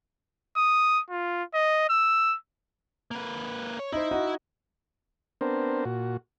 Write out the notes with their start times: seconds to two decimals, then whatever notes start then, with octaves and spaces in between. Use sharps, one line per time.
0.57 D#6
1.10 F4
1.54 D#5
1.89 E6
3.11 A#3 B4
3.79 C#5
3.92 D#4 E4 C5
4.11 D#4 F#4 D#5
5.41 B3 C4 D4 A#4 C5
5.85 A#2 F#4